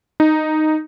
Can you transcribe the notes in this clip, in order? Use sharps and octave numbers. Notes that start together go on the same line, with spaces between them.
D#4